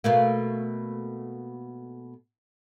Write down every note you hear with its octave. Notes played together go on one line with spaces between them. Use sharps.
B2 A3 A#3